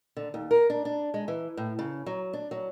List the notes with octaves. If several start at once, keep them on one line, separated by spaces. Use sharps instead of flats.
D3
D#2
A#4
D4
D4
G#3
E3
A2
C#3
F#3
D4
F#3